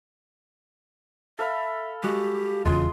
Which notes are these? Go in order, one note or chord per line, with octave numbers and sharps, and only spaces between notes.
A4 E5 F5 B5
G#3 F#4 G4
D#1 E2 C#3 G#3 F4 C6